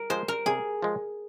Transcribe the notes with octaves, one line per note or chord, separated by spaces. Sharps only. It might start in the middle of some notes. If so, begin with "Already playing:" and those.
Already playing: A#4
F3 G#3 C5
A#4
C3 G#4
F3 G#3